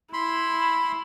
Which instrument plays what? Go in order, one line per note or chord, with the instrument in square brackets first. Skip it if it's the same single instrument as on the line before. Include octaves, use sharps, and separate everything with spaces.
[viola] E4 [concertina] B5 C6